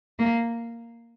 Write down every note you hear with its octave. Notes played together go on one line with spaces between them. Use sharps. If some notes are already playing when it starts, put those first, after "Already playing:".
A#3